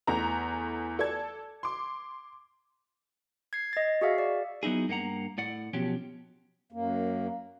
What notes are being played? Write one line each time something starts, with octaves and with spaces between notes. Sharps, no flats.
E2 A3 A#5
A4 D5 A5 G#6
C6 D6
G#6 C7
D#5 A6
F#4 G#4 E5 F5
D5
F#3 B3 D#4 E4 G#4
G2 A#3 D#4 F#5 A#5
A2 D5 F#5
B2 F3 F#3 C#4 G4
F#2 A#3